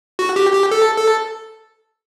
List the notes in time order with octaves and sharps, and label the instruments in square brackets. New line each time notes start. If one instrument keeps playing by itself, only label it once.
[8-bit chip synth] F#4
G4
G4
A4
A4